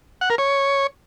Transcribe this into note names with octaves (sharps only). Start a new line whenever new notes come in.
F#5
A#4
C#5